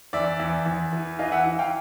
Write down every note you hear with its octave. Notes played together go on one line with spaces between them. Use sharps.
E2 D5 E5
E2
E2
E3
E3 D#5 F5
E5 F#5
E3
F5 G5